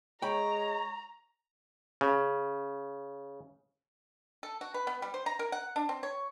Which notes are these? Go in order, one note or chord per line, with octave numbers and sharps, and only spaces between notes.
G#3 C#5 G5 A#5 B5
C#3
A4
F#4
B4
B3
G3
C5
A#5
A#4
F#5
D4
C4
C#5